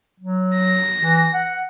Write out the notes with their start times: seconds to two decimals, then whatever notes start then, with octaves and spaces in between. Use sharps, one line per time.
0.20 F#3
0.55 A#6
0.99 E3
1.34 F#5